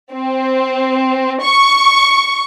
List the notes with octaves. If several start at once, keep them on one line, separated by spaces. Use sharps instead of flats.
C4
C#6